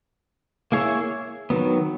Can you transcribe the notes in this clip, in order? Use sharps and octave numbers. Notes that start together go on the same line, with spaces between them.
A#3 E4 G#4 C#5 E5
D#3 F#3 B3